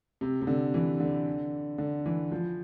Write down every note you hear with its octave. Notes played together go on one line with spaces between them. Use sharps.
C3
C3
D3
E3
D3
D3
E3
F3